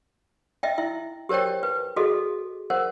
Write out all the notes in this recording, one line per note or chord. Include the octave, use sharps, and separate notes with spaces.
D#5 E5 G5
E4 E5
G4 A#4 C5 C#5 G5
B4
F#4 G#4 A4 D#5
A#4 C5 F#5